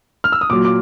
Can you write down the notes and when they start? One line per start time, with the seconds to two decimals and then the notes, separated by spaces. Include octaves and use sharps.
0.24 F6
0.32 E6
0.41 D#6
0.50 A#2 F#3 D6
0.65 D6